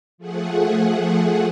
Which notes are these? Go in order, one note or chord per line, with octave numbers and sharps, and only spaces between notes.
F3 A3 G#4 F#5